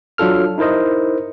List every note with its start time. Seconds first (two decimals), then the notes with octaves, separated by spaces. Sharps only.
0.18 F#3 D4 F4 A4 F6
0.58 D#4 E4 A#4 C5 D#5